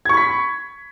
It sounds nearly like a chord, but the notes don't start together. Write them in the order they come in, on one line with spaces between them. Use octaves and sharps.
G#6 C#6 B5 B6